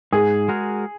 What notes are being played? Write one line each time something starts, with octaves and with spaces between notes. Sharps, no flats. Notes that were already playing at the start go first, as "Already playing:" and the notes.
G#2 G#4
G#3 F#4 A#4